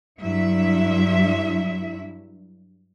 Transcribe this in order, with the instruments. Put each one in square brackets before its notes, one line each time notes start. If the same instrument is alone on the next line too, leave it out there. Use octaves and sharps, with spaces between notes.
[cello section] G2 F#3 E4 E5